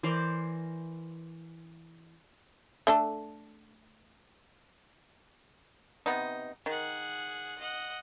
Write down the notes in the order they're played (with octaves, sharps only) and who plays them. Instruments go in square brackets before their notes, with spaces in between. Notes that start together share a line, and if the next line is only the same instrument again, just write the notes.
[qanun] E3 A#4 C5 D5
[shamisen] A3 D4 A4
[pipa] C3 B3 D#4
[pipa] D#3 [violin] G#4 F#5
[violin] D#5 F#5